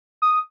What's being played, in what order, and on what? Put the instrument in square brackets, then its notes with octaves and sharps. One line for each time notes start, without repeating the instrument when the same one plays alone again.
[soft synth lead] D#6